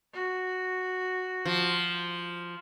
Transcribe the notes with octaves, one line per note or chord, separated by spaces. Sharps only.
F#4
F3